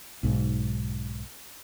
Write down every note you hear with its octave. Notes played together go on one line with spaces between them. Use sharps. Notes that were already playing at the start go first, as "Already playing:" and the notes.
B1 G#2